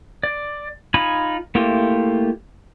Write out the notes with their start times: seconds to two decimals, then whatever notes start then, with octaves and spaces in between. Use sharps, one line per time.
0.23 D5
0.94 D#4 F4 G#5 B5
1.55 A3 A#3 E4 F4 G4